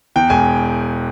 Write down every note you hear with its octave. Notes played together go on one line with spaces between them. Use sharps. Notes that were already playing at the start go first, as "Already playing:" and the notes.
E2 G5
E1 G#5